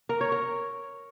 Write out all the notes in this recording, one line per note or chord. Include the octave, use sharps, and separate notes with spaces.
A#4
C#5
A#4